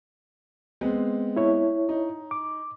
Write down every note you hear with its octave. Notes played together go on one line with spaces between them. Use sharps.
G#3 B3 C4
E4 C#5
D#4
D6